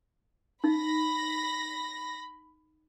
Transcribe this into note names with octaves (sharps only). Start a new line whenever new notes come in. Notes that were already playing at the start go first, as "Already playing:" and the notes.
D#4 B5 A#6